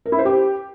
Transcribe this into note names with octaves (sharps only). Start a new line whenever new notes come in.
A#4
E4
C5
G4